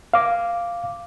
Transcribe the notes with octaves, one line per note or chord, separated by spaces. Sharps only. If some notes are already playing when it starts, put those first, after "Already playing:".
F5 D6